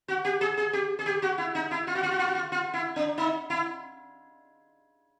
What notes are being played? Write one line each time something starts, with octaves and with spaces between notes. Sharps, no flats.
F#4
G4
G#4
G#4
G4
G#4
G4
F#4
E4
D#4
E4
F4
F#4
F4
F#4
F4
F#4
F4
F4
E4
D4
D#4
E4